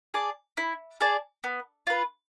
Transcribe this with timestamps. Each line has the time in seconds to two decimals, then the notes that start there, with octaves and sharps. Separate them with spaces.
0.14 G#4 D5 A5
0.57 E4
1.01 G#4 D5 A5
1.44 B3
1.87 F4 B4